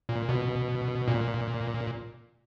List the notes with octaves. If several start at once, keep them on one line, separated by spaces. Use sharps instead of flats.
A#2
B2
A#2